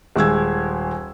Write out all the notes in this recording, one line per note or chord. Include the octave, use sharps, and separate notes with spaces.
D#1 G#3 E6 G#6